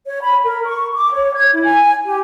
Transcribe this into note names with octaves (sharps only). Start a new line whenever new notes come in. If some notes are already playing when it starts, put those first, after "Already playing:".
C#5
B5
A#4
C#6
D6
C#5
G#6
E4
G#5
G4